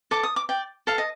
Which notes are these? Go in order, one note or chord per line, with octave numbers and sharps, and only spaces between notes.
A4 D6
D#6
D6
D5 G5
A4 F5
D#5